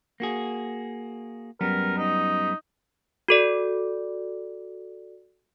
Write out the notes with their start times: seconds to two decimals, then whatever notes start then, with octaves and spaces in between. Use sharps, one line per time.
0.20 A#3 F#4 G#4
1.61 F#2 G3 B3 A#4
1.98 D#4
3.28 F#4 A4 D5